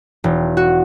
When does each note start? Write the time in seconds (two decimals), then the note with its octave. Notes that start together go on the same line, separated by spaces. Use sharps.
0.24 E1
0.57 F#4